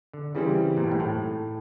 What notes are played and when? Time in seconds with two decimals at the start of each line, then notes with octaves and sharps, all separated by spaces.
0.13 D3
0.35 C#3 E3 G3 C4
0.77 A#2
0.84 A2
0.92 G#2
1.00 A2